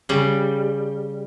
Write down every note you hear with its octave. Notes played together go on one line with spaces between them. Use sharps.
C#3 G3